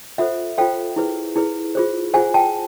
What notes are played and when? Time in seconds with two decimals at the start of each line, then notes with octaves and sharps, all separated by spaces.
0.18 F4 A4 C5 E5 F#5
0.58 F4 A4 C5 F5 G5
0.96 E4 G#4 B4
1.36 E4 G#4 B4
1.75 F4 G#4 C5
2.14 F4 G#4 C5 F#5 G#5
2.34 G5 A5